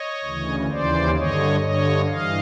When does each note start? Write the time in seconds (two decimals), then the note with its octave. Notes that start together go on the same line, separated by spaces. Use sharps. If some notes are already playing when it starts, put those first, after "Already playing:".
Already playing: C#5 D#5
0.24 D2 C#3 E3
0.69 D#2 C#3 E3 C5 D5
1.15 G2 D3 C#5 D#5
1.60 G2 D3 C#5 D#5
2.06 G2 E3 D#5 F5